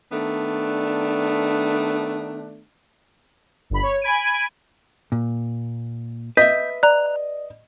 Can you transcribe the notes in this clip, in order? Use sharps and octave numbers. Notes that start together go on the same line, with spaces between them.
D#3 A3 B3 D4
G1 B5
C#5
G#5 B5 G#6 D7 D#7
A#2
B4 D#5 E5 G6 B6
D5 A#5 F#6